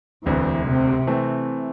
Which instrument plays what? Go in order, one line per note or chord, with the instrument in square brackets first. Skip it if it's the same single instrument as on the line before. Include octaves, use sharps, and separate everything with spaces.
[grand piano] E1 D2 D3 C4 [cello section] E3
[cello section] C3
[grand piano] C3 E3 A3 C4